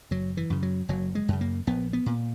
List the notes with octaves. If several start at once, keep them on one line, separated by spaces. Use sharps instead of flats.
F#1 F#3
E3
F#2 C#3
F#3
F#1 F#3
G#3
F#2 C#3
A#3
A#1 B3
B3
A#2